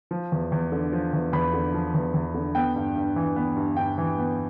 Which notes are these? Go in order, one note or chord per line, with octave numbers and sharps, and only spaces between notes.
F3
E2
E2
D3
F3
E2
E2 B5
D3
F3
E2
E2
D3
B3 G5
G2
G2
E3
B3
G2
G2 G5
E3
B3